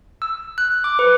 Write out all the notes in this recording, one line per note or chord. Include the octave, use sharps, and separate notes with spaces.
E6
F#6
D6
B4